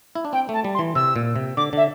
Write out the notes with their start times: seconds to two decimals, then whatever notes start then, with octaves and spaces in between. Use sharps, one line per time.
0.15 E4
0.25 D4
0.33 C4 G5
0.49 A3 A5
0.64 G3
0.74 C6
0.79 E3
0.95 C3 E6
1.16 A#2
1.36 C3
1.57 D3 D6
1.73 D3 E5